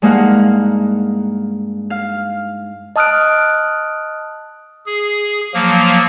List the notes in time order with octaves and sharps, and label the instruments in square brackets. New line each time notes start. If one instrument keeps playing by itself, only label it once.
[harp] G2 G#3 A#3 D#4 F5 F#5
F5
[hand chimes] D#5 A5 D#6 F6 F#6 D7
[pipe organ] G#4
F3 F#3 A#3